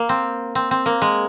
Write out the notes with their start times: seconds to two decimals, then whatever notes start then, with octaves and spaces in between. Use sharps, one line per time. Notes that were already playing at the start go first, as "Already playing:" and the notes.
Already playing: A#3
0.09 C4
0.55 C4
0.71 C4
0.86 A#3
1.02 G#3